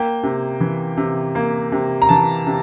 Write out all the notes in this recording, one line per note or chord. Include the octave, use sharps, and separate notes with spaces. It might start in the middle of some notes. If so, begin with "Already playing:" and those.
Already playing: A#3 G5
C3
E3
C3
A#3
C3
A#5
E3 A5
C3